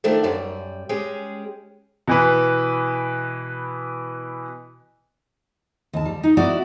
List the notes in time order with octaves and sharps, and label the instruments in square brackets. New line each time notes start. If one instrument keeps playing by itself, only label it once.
[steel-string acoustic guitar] D#3 F3 A3 A#3 D4
F#2 G3
G#3 C#4 G4 G#4
[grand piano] B2 E3 B4
[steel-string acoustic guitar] D#2 A5
G3
D#4
B3 E4 F#4 D5